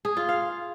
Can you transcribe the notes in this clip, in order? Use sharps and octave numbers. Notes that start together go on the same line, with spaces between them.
G#4
F4
F5